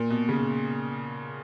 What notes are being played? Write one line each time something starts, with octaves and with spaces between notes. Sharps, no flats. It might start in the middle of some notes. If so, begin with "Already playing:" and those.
Already playing: A#2
B2
C#3